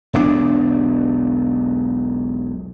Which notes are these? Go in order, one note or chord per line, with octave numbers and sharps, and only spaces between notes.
E1 B1 A#2 D4